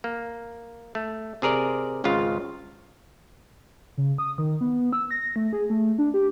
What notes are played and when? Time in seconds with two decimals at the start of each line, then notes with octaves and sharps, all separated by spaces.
0.04 A#3
0.95 A3
1.42 C3 G#4 A#4 D5
2.04 G#1 C#2 C#3 F4 F5
3.98 C#3
4.18 D#6
4.38 D#3
4.61 B3
4.93 E6
5.11 A#6
5.36 A3
5.53 G#4
5.70 A3
5.98 D4
6.14 G4